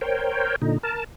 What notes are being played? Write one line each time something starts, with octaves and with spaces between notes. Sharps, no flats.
A#4 C5 C#5 G5
A#2 D3 D#4
A#4 A5